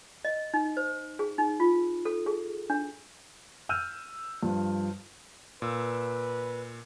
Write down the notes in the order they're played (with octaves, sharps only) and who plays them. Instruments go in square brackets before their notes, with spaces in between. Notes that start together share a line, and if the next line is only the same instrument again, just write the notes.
[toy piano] D#5
D#4
C5
G#4
D#4
F4
A4
G#4
D4
[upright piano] E6 F6 G6 D#7
G2 F3
[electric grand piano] A#2 E6 [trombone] B4